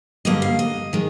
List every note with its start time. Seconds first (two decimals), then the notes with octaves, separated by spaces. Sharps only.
0.25 G2 D3 G3 A#3 D#5
0.42 F5
0.59 D#5
0.93 D#3 G#3